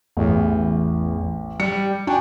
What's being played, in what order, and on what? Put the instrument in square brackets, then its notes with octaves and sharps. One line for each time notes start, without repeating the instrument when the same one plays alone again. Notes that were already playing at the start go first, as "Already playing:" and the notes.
[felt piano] A1 [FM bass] E2
[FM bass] G3 [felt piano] C#7
[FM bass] D4 [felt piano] F#4 G5 G#5